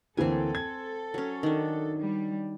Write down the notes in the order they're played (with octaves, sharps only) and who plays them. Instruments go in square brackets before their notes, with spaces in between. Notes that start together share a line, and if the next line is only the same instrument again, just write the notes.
[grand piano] D2 E3 A#3 [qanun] C4 G#5 [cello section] A4
[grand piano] G#6
[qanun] F#3 C#4
D#3 D4
[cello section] G3